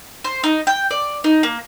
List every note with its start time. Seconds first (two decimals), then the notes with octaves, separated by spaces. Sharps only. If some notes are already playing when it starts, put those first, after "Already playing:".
0.24 C5
0.44 D#4
0.67 G5
0.91 D5
1.24 D#4
1.43 A#3